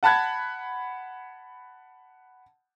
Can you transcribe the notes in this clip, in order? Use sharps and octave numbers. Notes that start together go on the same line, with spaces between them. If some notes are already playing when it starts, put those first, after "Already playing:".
F#5 A5 B5 F#6 G#6